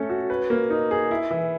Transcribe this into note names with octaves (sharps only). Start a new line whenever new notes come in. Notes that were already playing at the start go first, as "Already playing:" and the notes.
Already playing: A3 C#4 A4
F#4
B4
A#3
D#4
G#4
E4
E3